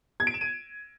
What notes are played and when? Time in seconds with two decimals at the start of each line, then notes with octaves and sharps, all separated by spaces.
0.20 G#6
0.27 D7
0.34 E7
0.41 D#7